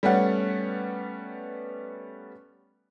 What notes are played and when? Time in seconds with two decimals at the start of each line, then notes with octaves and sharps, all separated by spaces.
0.03 G3 A3 B3 C#4 F#5